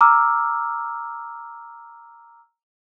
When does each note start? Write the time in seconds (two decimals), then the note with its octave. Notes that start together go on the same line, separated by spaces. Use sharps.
0.01 A#5 D6 E6 F6